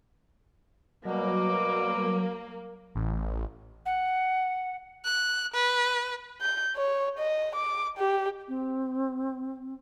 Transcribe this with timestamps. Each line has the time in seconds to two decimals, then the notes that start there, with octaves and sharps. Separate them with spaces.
1.05 B2 F#3 G3 A#3 D6
2.95 A1
3.86 F#5
5.05 F#6
5.54 B4
6.42 G6
6.76 C#5
7.19 D#5
7.56 D6
7.99 G4
8.48 C4